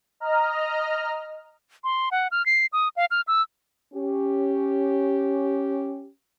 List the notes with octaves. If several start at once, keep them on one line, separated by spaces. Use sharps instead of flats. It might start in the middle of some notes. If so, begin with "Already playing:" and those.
D#5 A#5 F6
C6
F#5
F6
C7
D#6
F5
F6
E6
C#4 G4